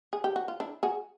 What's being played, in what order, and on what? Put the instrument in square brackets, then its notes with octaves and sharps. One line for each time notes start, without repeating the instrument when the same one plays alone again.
[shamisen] G#4
G4
F#4
F4
D4 E4
F#4 G#4